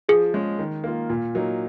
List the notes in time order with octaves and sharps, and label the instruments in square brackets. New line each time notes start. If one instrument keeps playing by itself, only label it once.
[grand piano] F3 [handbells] G#4
[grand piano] G#3 C#4
D#3
A#3 F4
A#2
F#3 A#3 D#4